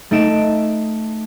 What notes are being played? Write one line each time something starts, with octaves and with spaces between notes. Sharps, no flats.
A3 D#4 D7 E7